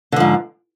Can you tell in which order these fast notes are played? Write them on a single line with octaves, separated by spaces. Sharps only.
D3 F3 G#2